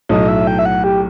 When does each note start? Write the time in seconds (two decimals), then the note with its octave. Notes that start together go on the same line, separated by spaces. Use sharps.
0.09 B1 A2 F#3 D#5
0.28 E5
0.47 G5
0.59 E5
0.66 F#5
0.84 G4